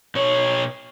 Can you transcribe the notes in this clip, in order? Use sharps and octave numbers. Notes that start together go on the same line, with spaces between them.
B2 C#5